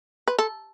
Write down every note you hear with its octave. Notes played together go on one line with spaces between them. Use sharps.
B4
A4